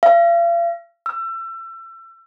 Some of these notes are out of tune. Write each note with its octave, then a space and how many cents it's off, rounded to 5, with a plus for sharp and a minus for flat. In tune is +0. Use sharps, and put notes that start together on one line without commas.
F5 -40
E6 +30